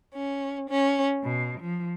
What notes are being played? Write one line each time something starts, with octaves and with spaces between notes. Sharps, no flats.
C#4
C#4
B2
F3